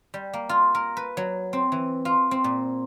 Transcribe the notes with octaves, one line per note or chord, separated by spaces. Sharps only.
G3
A#3
F4
A#4
B4
F#3
C4
E3
F4
C4
A#2